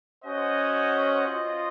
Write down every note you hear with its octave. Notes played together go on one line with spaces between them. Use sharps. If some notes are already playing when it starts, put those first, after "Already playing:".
C#4 F#4 C5 D#5 F#5
F4 C5 D#5